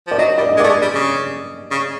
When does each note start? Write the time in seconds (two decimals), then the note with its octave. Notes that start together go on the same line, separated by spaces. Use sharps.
0.07 F3 D5
0.18 F#3 D#5
0.37 G3 D5
0.49 D#5
0.57 G#3
0.60 A3 D5
0.69 G#3
0.82 G3
0.95 C#3
1.71 C#3